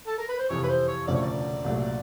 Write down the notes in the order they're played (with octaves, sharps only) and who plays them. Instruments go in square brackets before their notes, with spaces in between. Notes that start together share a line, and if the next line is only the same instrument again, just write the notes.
[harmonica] A4
A#4
B4
C5
[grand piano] F2 C3 E3 [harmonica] C#5
[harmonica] B4
C5
C#5
[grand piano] E1 D2 C#3 F3 A3 [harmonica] D5
[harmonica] C#5
D5
[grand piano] C2 A#2 F#3 A3